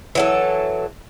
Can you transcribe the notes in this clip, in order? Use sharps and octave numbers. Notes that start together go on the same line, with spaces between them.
E3 F#3 A4